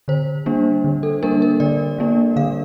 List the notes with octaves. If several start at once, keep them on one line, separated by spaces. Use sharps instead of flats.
D3 C5
G3 A#3 D4
D3
A4
G3 A#3 D4 A#4
A#4
D3 D5
G3 A#3 D4
D3 F5